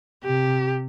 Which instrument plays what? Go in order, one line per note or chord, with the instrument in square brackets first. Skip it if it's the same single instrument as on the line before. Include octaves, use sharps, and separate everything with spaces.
[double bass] C3 [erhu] G4